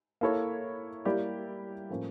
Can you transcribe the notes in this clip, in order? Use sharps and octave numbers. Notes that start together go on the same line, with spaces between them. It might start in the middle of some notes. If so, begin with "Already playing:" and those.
A#3 E4 A4 C#5
G3 A#3 E4 G4 D5
A2 F3 A#3 C#4